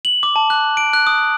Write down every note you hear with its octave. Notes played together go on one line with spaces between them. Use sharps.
F#7
D6
A5
F#6
D7
F#6
D#6